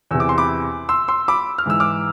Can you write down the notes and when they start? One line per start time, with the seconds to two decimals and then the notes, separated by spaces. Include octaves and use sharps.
0.11 E2 C3 E3 E6
0.20 D6
0.29 C6
0.38 B5 D6
0.89 C6 E6
1.08 C6 E6
1.28 B5 D6
1.58 F6
1.66 G#2 E3 E6
1.80 D6 F6